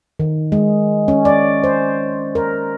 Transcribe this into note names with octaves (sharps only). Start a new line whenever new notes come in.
D#3
G#3
C#4
D5
C5
A#4